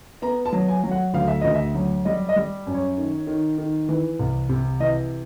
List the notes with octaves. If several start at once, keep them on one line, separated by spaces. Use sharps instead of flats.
B3 A#5
A5
F#3
G#5
F#3
F#5
D2 F5
E5
D2 D#5
E5
F#3
G3 D#5
D#5
G3
F#2
C#5
D#3
D#3
D#3
E3
C2
C3
E3 D#5